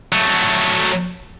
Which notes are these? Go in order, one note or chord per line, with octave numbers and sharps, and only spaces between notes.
F#3 A3